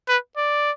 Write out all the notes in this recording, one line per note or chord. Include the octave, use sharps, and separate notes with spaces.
B4
D5